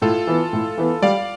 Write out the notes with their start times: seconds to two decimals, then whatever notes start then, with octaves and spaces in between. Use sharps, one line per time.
0.02 A2 F4 A4
0.27 E3 B3
0.53 A2
0.77 E3 B3
1.02 G3 D5 F5